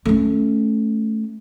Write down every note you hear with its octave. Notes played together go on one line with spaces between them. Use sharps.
A3 C#4